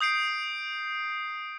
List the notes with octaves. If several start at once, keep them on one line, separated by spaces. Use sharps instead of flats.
D#6 G6 C7 D7